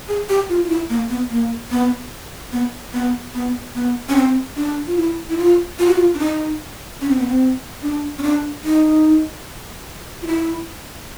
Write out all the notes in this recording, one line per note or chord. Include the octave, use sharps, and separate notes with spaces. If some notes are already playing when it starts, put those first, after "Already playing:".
G#4
G4
F4
F4
E4
A#3
B3
A#3
B3
B3
B3
B3
B3
C#4
C4
D4
F4
E4
E4
F4
F4
F#4
F4
D4
D#4
C#4
C4
B3
C4
D4
C#4
D4
D#4
F4
E4